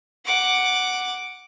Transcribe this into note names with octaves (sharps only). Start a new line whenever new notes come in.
F#5 D6